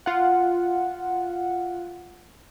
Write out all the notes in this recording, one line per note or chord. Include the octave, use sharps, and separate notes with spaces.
F4 F#5